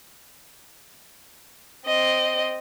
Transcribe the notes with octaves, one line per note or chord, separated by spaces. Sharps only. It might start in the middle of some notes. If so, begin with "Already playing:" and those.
C4 D#5